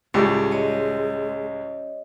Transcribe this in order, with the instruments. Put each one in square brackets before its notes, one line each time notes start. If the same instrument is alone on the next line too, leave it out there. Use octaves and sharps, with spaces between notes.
[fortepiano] C#2 A2 [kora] G3 C#4 [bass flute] G#3
[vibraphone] C#5 D#5